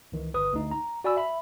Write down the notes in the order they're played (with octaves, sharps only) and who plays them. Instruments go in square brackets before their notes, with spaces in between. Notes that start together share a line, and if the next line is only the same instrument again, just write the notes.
[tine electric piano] C#2 D#3 E3
G1 B4 D#6
D2 D#4
A#5
F#4 D5 G#5 B5 E6
E5 B5